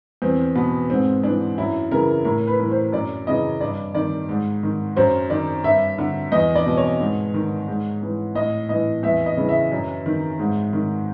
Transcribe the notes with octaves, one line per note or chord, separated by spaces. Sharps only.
E2 C4
B2 B3
G#2 C4
E3 D4
F#2 E4
C#3 E3 A#4
A2 A#4
B4
E3
C5
F#2 D5
C#3 E3 D#5
G2 D5
D#3 D5
G#2
D#3
F#2 C5
D#3 D5
G2 E5
D3
E2 D#5
D5
B2
C#5
G#2
D#3
G#2
E3
A2 D#5
E3 D#5
E2 E5
D#5
C#3 E3
E5
F#2
D#3
G#2
D#3